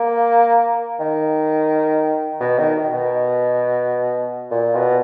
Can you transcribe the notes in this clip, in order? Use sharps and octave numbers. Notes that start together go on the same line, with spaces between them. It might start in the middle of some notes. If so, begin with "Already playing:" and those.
Already playing: A#3
D#3
B2
D#3
B2
A#2
B2